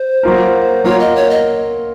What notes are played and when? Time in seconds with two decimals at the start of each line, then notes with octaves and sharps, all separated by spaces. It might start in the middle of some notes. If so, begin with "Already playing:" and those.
Already playing: C5
0.23 F#3 A#3 F4 A#4
0.84 F#3 A#3 F4 A#4 C#5
1.00 D#5
1.15 C#5
1.30 D#5